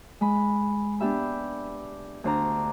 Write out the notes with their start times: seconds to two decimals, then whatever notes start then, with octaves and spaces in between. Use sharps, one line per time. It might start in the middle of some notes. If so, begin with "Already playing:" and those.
0.21 G#3 B5
1.00 B3 D4 G4 E5 B5
2.24 D2 D4 C5 D5 A#5